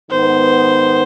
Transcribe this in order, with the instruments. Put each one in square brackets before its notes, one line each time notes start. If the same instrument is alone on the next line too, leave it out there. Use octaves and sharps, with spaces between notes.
[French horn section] G#2 D#3 B3 [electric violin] C5